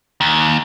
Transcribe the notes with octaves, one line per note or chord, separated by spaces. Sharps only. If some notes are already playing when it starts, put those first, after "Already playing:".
D#2